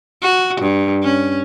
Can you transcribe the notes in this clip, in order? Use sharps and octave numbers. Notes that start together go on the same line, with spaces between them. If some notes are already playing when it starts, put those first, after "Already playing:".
F#4
G2
C#4